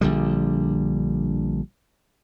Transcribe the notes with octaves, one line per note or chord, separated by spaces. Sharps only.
A#1 D3 G3